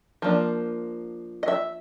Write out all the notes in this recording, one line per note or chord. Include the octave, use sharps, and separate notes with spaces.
F3 A#3 D4
D#5
E5